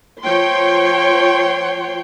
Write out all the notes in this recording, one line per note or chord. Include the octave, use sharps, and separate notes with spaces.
F3 C#5 G5 C6